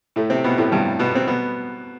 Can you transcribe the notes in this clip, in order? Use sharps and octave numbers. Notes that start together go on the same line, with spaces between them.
A2 A3
C3 C4
B2 B3
A2 A3
G2 G3
B2 B3
C4
B2 B3